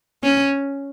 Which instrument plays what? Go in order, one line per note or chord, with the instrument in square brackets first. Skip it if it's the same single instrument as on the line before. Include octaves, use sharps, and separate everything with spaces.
[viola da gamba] C#4